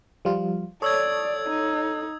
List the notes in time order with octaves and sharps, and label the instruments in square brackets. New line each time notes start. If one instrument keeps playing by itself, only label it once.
[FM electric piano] F3 G3 F4
[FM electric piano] A4 C#5 [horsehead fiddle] D5 [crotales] D#6 E6 G#6
[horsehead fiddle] D#4